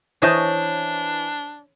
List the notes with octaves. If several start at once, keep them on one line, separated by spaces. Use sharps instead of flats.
E3 D4 C5 C#5 D#5 E5 A5 G6